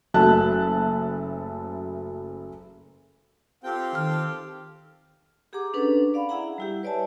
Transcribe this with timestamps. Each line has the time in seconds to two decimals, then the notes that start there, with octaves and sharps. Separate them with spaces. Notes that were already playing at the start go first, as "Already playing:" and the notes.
0.14 F#1 F#3 A3 E5 A5 F#6
3.63 C4 F4 G4 A4 F5 G5
3.95 D#3 F6
5.53 G4 G#4 F#5 A#5 D6
5.73 C#4 D4 A4 B4
6.14 D5 F5 F#5 B5
6.29 E4 G#4 E5 F#5 A#5
6.58 G3 E4 G4
6.83 B4 C#5 D5 E5 G#5 A5